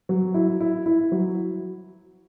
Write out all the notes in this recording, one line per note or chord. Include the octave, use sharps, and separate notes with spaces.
F#3
E4
E4
E4
F#3